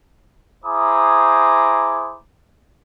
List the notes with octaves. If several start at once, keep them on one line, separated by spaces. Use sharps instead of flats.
E4 G#4 C5 A#5 D6 D#6